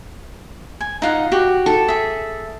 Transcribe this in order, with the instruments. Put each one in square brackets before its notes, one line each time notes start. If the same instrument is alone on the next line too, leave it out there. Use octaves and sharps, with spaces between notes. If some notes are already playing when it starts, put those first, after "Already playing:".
[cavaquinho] G#5
D#4 F4 F#5
F#4 G4
[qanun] A4
[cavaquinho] G#4 E5